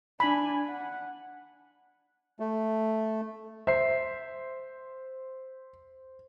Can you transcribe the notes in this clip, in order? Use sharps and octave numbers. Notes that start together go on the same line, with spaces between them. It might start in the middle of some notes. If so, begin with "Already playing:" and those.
D4 G#5 B5
F#5
A3
C5 E5 C7